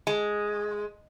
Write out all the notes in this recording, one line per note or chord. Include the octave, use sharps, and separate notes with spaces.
G#3